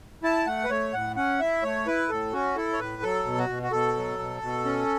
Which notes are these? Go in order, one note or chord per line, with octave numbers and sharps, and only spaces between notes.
E4 A5
A3 F#5
B4
A3 C#5
A2 F#5
C#4 F#5
E4 E5
A3 C#5
E4 B4
A2 A4
C#4 F#4
E4 A4
C#5
A2 B4
F#3 A4
B2
F#4
B2
F#4
B2 A4
F#3
B2
B2
C#4